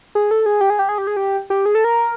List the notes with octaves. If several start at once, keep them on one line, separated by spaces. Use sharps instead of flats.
G#4
A4
G#4
G4
G#4
G4
G#4
G4
G#4
G4
G4
G#4
A4
A#4